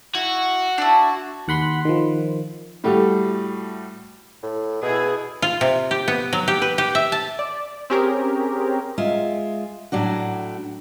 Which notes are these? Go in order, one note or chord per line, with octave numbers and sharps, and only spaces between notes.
E4 F#4
D4 E4
D#2 F#5 B5 C6
D#3 F3
A2 G3 A3 F#4 G4
A2
B2 E4 G#4
F4
C3
G4
B3
F#3
G4
B4
G4
E5
A5
D5
C4 C#4 G4 G#4 A#4
G#3 F4 E5
A2 F#3 D4 F#4